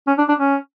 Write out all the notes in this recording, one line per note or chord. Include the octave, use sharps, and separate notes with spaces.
C#4
D4
D4
C#4